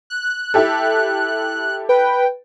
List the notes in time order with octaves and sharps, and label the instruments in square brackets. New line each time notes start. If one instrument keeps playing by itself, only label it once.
[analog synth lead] F#6
[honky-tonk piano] E4 G4 A4
[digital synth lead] B4 [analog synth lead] G5